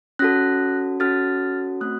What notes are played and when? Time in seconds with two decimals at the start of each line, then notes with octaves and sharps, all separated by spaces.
0.19 C#4 F#4 A4 F#6 A#6
1.00 C#4 F#4 A4 F6 A6
1.81 A3 C4 F#4 D#6 F#6